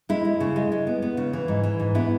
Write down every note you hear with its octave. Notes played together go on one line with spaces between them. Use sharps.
G#3 E4
G#3
C#3
G#3
G#3
B3
B3
C#3
E3
G#2
E3
G#2
B3 E4